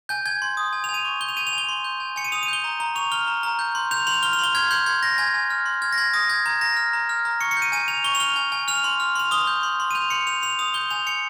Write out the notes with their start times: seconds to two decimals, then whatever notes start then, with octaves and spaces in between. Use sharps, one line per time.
0.09 G#5 G6
0.26 G#5 G#6
0.42 C6
0.57 D#6
0.73 G#5
0.84 F7
0.89 G#5
0.94 D#7
1.05 C#6
1.21 G6 G7
1.29 F7
1.37 G#5 D#7
1.47 F7
1.53 G#5
1.58 G7
1.69 C6
1.84 G6
2.00 G#5
2.16 G#5 C#7
2.24 D#7
2.32 D#6 F7
2.43 D#7
2.48 G6 G7
2.64 A#5
2.80 A#5
2.95 C#6 F7
3.12 F6 G7
3.27 A#5
3.43 A#5
3.59 G6
3.75 C6
3.91 G6 F7
4.07 C6 F7
4.23 F6 G7
4.33 F7
4.39 C6 G7
4.55 F6 G#6
4.71 C6 G6
4.86 C6 G#6
5.02 G6 A#6
5.18 G#5 G#6
5.34 G#5
5.50 F6
5.66 C6
5.82 F6 G#6
5.92 A#6
5.98 C6 G#6
6.13 D#6 A#6
6.29 G6 G#6
6.46 A#5 G#6
6.61 A#5 A#6
6.77 F6
6.93 A#5
7.09 F6
7.25 A#5
7.41 C#6 C#7
7.51 C#7
7.57 G6
7.62 D#7
7.72 G#5 D#7
7.88 G#5 F7
8.04 C#6 G7
8.15 F7
8.20 F6 G7
8.36 G#5
8.52 G#5
8.68 F6 F7
8.84 C6
9.00 F6
9.15 C6 F7
9.31 D#6 G7
9.47 G6
9.63 C6
9.80 C6
9.91 D#7
9.95 G6 F7
10.10 C6 C#7
10.27 G6 F7
10.42 C6 F7
10.59 D#6 F7
10.74 G6 G7
10.91 G#5 F7
11.06 G#5 C#7